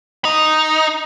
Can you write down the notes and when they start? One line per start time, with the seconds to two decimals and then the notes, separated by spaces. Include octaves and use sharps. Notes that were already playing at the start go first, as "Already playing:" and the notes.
0.25 D#4